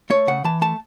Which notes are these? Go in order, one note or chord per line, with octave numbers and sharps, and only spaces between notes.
A3 C#5
C#3 F#5
E3 A5
A3 A5